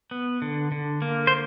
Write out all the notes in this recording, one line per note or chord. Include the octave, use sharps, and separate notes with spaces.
B3
D3
D3
A#3
C5